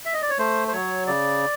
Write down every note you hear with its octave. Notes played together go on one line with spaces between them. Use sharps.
E5
D#5
D5
C#5
A3 C5
C5
F#3 C#5
C#3 D5